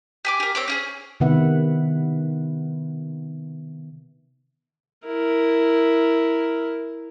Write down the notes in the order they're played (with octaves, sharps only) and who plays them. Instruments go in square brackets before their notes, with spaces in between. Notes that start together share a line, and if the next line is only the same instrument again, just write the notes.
[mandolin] G4 G#5 D6
G4 A#4
C4 C#5 D6
C#4 E4 G#4
[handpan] C3 D#3 B3 B4 E5 F#5
[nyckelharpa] E4 A#4